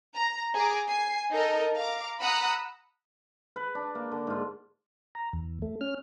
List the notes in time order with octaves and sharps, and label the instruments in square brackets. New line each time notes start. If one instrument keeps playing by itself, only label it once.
[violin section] A#5
G#4 A#5 D6
G#5 C7
D#4 A4 A#4 D#5
F5 A#5 D6
F#5 A#5 B5 D#6 E6 F#6
[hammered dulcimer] B4
D4
A#3
D3
G#2 F4
[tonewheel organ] A#5
E2
A3
C#4 F6